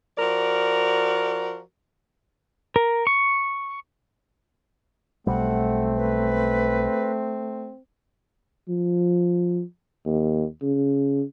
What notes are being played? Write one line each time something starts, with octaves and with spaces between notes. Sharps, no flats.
F3 F#4 A#4 D5
A#4
C#6
B1 B2 G3 A3 C4 F#5
B4
F3
D#2
C#3